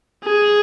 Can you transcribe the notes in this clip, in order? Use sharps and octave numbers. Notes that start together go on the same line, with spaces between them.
G#4